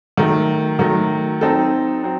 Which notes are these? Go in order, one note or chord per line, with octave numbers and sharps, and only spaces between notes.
D#3 F#3 A3
D#3 F#3 A3
F#3 C4 D#4 A4
F#3 C4